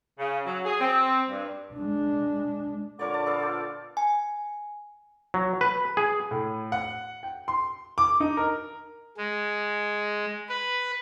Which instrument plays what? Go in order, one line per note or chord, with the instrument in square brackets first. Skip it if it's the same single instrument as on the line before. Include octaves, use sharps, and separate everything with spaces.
[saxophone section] C#3
F#3
G#4
C4
G2
[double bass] G#3 D4
[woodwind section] A#2 D3 D6 [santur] A#4 C#5 D5
[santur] A5
B3 A4 F5
F4 G5
[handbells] G#5
[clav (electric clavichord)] F#3
B4
G#4
[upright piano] A2
F#5
G5
C6
D6
D#4
A#4
[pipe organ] G#3
B4